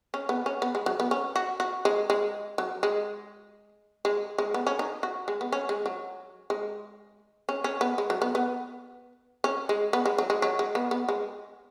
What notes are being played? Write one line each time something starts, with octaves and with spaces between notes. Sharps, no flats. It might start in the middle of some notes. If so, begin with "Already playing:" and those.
C#4
B3
C#4
B3
G#3
F#3
B3
C#4
F#4
F#4
G#3
G#3
F#3
G#3
G#3
G#3
B3
C#4
D#4
F#4
G#3
B3
C#4
G#3
F#3
G#3
C#4
C#4
B3
G#3
F#3
B3
B3
C#4
G#3
B3
G#3
F#3
G#3
F#3
G#3
B3
B3
G#3